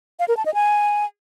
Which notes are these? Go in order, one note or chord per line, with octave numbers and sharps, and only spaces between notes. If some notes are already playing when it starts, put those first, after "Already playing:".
F5
A#4
A5
D#5
G#5